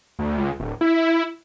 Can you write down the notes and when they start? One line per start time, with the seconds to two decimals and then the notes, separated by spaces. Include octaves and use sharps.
0.19 D2
0.38 C#2
0.59 D1
0.81 E4